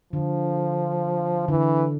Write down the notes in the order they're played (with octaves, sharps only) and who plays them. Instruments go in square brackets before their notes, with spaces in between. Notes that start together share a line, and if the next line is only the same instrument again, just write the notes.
[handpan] D3 [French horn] F3
[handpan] D3 [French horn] E3